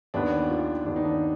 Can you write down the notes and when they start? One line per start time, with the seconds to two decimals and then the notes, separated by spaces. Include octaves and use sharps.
0.14 D#2 D#3 B3 D4
0.50 F4
0.85 D#2 D#3 B3 D4
0.96 D#4
1.05 D4